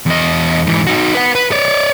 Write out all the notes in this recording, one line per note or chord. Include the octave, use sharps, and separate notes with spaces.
E2 D#5
G#2 E3
D#4 F#4
B4 F#5
B4
C#5 D5